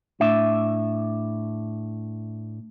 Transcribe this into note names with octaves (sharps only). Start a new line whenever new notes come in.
A2 D4 E5